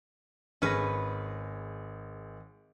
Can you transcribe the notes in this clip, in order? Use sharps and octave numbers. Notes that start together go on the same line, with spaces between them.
G#1 C#4 G#4 B4 A#6